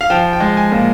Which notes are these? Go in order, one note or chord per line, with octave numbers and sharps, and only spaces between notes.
F5
F3 G5
G5
G#3
G#5
A#2